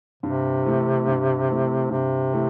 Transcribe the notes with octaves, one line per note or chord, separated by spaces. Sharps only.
G2 C3
E3 A3 C4
G2
E3 A3 C4
G2 C3
E3 A3 C4